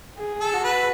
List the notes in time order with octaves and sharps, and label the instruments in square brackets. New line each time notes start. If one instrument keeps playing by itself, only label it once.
[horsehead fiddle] G#4
[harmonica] A4
[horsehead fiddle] F#4
[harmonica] B4